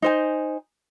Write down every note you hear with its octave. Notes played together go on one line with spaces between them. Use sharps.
D#4 C5 G#5